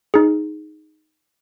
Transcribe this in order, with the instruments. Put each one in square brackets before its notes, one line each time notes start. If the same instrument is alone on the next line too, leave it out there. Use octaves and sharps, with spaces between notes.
[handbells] D#4 G#4